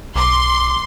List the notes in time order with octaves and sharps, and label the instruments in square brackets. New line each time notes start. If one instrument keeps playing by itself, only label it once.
[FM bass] B1 [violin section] C6 [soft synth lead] D6